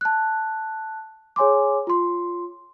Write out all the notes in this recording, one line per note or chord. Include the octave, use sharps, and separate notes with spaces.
A5 F#6
G#4 C#5 G#5 C6 D6
F4 C6